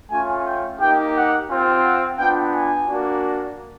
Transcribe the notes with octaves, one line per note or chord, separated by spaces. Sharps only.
A3 C#4 F4 G#5
G5
A#3 D#4 G4 G5
F#5
C4 F4
F#5
B3 D4 F4 G5
G#5
A#3 D4 F#4